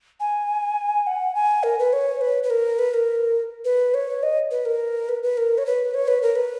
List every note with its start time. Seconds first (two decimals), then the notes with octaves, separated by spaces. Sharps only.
0.20 G#5
1.07 F#5
1.35 G#5
1.63 A#4
1.79 B4
1.93 C#5
2.21 B4
2.43 B4
2.50 A#4
2.79 B4
2.94 A#4
3.65 B4
3.94 C#5
4.23 D#5
4.51 B4
4.65 A#4
5.09 B4
5.23 B4
5.37 A#4
5.58 C#5
5.66 B4
5.94 C#5
6.08 B4
6.22 A#4
6.36 B4